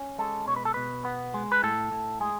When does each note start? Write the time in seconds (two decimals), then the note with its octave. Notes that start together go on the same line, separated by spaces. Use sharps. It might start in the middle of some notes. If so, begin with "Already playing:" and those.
Already playing: C#4
0.18 G#3 A4
0.47 B2 C#5
0.56 B4
0.65 A4
0.74 B2 B4
1.05 B3
1.34 G#3
1.52 B4
1.63 A2 A4
1.92 A2
2.20 G#3 G#4